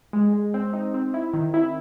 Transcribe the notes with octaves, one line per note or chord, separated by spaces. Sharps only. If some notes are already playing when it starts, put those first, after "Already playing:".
G#3
G#3
C4
D#4
C4
E4
D#3
E4